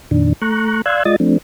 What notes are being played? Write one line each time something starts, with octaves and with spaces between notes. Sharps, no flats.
F2 A#2 D#3 D4
A3 A#5 C#6 F#6
D5 F5 C6 E6 F#6 G#6
G#3 F4 D5 D#5 D#6 A6
F3 A3 C4 D4